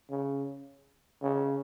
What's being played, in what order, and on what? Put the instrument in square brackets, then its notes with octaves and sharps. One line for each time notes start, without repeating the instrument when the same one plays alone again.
[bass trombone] C#3
C#3